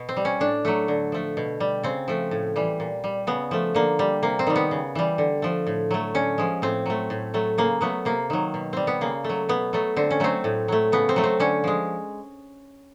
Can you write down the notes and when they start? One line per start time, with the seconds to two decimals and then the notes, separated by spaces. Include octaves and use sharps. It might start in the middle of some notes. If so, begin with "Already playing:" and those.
Already playing: B2
0.09 C4
0.16 G3
0.25 C#4
0.40 A2 D4
0.65 F#3 A3
0.88 D3
1.12 F3 A3
1.37 B2
1.60 G3
1.83 C#3 C4
2.08 F3 A3
2.31 A2
2.56 E3 G3
2.80 A#2
3.04 G3
3.27 C#3 B3
3.51 F3 A3
3.75 D3 A#3
3.99 G3
4.23 C3 A#3
4.39 C4
4.47 D#3 G3
4.56 B3
4.71 C#3
4.95 E3 G3
5.18 D3
5.42 F3 A3
5.67 A2
5.91 F#3 A3
6.14 D3 C#4
6.38 F3 G#3
6.62 A2 C4
6.86 F#3 A3
7.10 A2
7.34 F#3 A3
7.58 C#3 A#3
7.81 F#3 A3 B3
8.05 C3 A#3
8.30 D#3 F#3
8.54 B2
8.73 G3 C4
8.87 B3
9.01 C#3 A#3
9.24 A3
9.29 F#3
9.49 B2 B3
9.73 F#3 A3
9.96 D3 C4
10.10 C#4
10.20 F#3 A3 C4
10.44 A2
10.68 F#3 A3
10.92 C#3 B3
11.09 C4
11.16 F#3 A3
11.24 C4
11.40 D3 C#4
11.64 F3 G#3